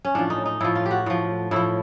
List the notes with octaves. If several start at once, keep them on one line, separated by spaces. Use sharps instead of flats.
C#4
A2 F3 D4
D#4
D#4
A2 F3 E4
F4
G4
F#4
A2 F3
A2 F3 E4